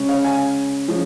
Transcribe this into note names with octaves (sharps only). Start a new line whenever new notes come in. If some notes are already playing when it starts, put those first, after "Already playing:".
Already playing: C#3 G#3 C#4
C#5 F5
F5 G#5
F3 G#3 C#4